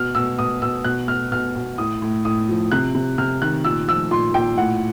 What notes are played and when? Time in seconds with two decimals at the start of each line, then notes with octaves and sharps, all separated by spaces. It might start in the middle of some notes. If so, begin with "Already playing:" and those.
Already playing: B2 F6
0.15 B2 E6
0.38 B2 D#6
0.62 B2 E6
0.84 B2 F#6
1.08 B2 F6
1.32 B2 F6
1.56 B2
1.78 A2 D#6
2.02 A2
2.25 A2 D#6
2.49 F3
2.72 C3 F#6
2.94 C3
3.18 C3 F6
3.42 D#3 F#6
3.65 A#2 E6
3.88 F3 E6
4.11 A#2 C6
4.34 A#2 G5
4.58 A2 F#5